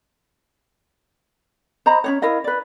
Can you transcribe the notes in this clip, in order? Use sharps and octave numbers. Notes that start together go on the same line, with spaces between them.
C5 D#5 A#5 B5
C#4 D4 C#5
E4 A#4 D#5 F5
B4 D5